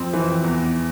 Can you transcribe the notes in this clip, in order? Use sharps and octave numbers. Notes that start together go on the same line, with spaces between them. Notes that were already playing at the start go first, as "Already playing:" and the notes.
Already playing: F2 C4
E3
E2